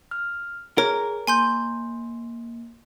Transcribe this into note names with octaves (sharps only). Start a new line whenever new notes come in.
F6
G#4 A#4 C#5
A#3 G#5 C6 G6